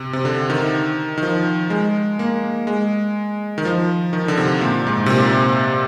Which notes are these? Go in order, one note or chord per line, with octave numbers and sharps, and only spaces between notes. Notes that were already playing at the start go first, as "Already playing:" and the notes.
Already playing: C3
C3
D3
D#3
D#3
F3
G#3
A#3
G#3
D#3
F3
D#3
D3
C3
A#2
G#2
C3
A#2